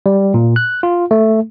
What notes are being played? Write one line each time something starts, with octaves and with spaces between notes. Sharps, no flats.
G3
A#2
F#6
F4
A3